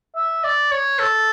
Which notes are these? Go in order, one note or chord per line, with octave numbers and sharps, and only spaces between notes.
E5
D5
C#5
A4